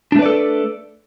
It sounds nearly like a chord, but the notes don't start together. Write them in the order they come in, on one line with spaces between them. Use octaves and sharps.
D4 A3 B4 D5 A4